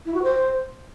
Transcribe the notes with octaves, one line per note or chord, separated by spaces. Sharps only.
E4
F#4
C5